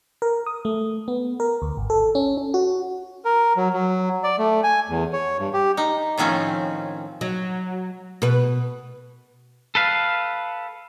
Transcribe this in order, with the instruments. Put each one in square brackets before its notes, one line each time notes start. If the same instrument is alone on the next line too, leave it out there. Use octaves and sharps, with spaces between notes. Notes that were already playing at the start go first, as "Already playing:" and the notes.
[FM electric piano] A#4
D#6
A3
B3
A#4
D2
G#1
A4
C#4
C#4
F#4
[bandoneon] A#4
F#3
F#3
D5
A3
G#5
E2
C#5
G2
G4
[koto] D#4
A2 D#3 F3 C4 C#4
[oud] F#3
B2 B4
[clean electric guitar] A4 B4 F5